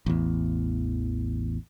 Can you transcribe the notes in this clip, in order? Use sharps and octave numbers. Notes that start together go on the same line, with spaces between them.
A1 E2